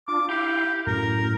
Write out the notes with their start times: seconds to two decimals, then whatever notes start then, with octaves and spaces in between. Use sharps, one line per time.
0.08 D4 F4 D6
0.29 E4 G4 F5 G5
0.87 F#2 A2 A#4